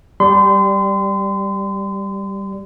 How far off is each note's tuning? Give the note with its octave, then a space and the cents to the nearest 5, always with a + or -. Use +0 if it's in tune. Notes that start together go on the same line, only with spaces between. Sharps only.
G3 +0 C6 -35